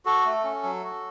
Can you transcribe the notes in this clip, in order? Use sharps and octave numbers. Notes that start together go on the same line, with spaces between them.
F#4 A4
A3
C#4
F#3
F#4